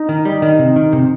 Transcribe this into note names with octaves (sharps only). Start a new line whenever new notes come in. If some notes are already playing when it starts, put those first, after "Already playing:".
Already playing: D#4
D#3
G3
D#3
C3
D#3
C3